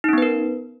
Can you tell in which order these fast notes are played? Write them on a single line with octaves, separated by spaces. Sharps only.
D#4 C#4 B3 B4 A#4